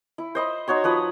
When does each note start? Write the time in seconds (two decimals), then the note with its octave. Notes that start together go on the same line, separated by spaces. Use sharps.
0.18 E4
0.35 C5 D#5 B5
0.68 D#4 F#4 C#5 C6
0.84 F3 B4 D#6